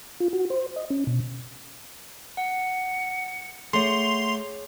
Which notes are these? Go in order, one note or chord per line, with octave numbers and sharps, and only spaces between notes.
F4
F#4
C5
D#5
C#4
B2
F#5 C#7
A3 G#4 C#5 F#5 C6 F7